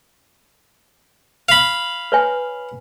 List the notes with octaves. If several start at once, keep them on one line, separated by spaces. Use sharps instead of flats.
F5 B5
B4 C#5 G#5